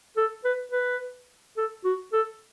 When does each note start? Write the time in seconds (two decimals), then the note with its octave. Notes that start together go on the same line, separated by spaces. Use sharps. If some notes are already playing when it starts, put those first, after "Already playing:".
0.17 A4
0.44 B4
0.72 B4
1.57 A4
1.84 F#4
2.13 A4